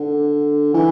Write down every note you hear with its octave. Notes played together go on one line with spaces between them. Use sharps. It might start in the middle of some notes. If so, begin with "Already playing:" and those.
Already playing: D3
E3